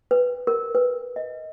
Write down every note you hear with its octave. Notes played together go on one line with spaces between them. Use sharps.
B4
A#4
B4
D#5